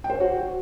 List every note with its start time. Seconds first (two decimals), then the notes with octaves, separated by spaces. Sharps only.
0.04 G5
0.10 C5
0.15 C#5
0.20 F#4